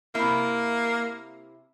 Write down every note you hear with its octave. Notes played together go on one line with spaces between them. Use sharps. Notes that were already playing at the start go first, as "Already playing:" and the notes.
C3 A#3 E4